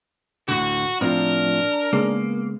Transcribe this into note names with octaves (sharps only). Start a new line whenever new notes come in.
D2 A2 D3 F#4
A2 F3 C4 D4 F4 A#4
C#3 G#3 A#3 B3